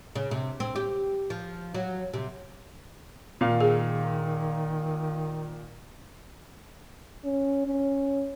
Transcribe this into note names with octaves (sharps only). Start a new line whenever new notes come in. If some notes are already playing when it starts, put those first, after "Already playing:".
C#3
C3
C4
G4
F3
F#3
C3
A#2 D#3 F5
G#4
C#4
C#4